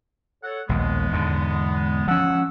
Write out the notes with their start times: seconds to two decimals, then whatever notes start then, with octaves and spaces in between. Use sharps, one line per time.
0.43 A4 C#5 F#5
0.69 A#1 D#2 G#3 B3
1.11 E2 G#2 D3
2.08 F3 C#4 F#5 E6